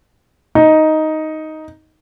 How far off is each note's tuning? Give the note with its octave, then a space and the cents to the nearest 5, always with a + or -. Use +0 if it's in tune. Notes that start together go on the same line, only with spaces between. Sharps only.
D#4 +5